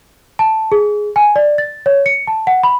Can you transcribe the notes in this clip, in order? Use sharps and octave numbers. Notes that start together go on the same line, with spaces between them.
A5
G#4
G#5
D5
A6
C#5
C#7
A5
F#5
B5